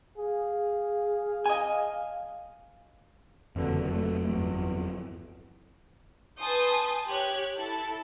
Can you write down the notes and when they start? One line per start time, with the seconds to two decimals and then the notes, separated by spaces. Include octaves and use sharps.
0.18 G#4 F5
1.46 D#5 G#5
3.56 F#1 F2 D3 E3 F#3
3.88 A3
4.25 G1 E2
6.39 B4 G#5 A5 C6 D#6 G6
7.08 G4 C#5 F#6 G#6
7.56 E4 A4 A6